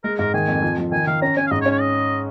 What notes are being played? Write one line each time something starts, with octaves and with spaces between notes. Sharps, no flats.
G#3 A#4
G#2 A#4
D#3 G#5
F2
F3
F3
D#3 G#5
D#3 F5
C#4 A#5
C#4 G#5
F5
G#2 D#5
C#5
C#4
C#5
D#5